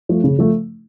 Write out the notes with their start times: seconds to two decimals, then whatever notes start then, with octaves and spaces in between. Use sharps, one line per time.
0.09 F3 A3
0.24 C#3
0.38 F3 A3